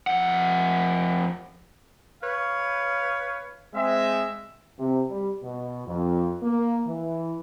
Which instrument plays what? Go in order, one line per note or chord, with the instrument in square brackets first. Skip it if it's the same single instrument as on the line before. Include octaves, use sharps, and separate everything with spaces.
[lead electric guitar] F2 F#5
[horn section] B4 C#5 F5
[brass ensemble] G#3 C4 E5
[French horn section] C3
G3
B2
F2
A#3
E3